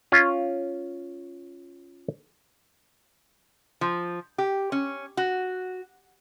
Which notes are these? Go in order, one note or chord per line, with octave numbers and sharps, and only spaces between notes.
C#4 F4
F3
G4
C#4
F#4